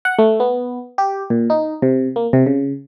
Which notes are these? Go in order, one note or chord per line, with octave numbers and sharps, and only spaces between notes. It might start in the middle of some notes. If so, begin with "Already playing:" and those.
F#5
A3
B3
G4
A#2
D#4
C3
A#3
C3
C#3